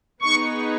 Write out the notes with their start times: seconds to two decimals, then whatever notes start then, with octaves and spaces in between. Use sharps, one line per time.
0.22 B3 D#4 G#4 B4 C#6